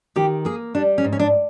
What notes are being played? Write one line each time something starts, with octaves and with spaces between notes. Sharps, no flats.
D#3 G4
A#3 G#4
G3 D4
C#4
G#2
C#4
D4